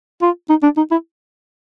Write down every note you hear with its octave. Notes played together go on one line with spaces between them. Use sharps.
F4
D#4
D4
D#4
E4